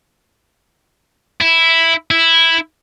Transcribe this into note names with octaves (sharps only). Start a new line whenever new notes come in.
E4
E4